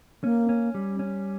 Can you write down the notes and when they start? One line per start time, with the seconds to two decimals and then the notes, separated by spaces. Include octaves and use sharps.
0.23 A#3 C#4
0.49 C#4
0.75 G3
0.99 C#4